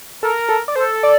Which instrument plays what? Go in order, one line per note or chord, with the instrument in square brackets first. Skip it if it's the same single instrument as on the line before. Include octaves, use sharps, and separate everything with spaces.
[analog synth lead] A4 [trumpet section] A#4
[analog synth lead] A4
D5
[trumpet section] A4 [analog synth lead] C5
[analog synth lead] D5